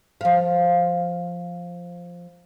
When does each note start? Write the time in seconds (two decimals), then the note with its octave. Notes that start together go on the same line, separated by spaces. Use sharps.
0.21 F3 F5